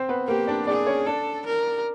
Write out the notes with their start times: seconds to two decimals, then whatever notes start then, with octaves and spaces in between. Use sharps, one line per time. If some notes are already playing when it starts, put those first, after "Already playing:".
Already playing: C4 C5
0.09 B3 B4
0.28 A#3 G4 A#4
0.47 D4 D5
0.67 D4 G#4 D5
0.86 C#4 C#5
1.06 D4 A4 D5
1.46 A#4